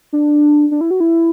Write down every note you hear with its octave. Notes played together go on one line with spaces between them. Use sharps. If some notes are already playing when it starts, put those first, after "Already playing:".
D4
D4
E4
F#4
E4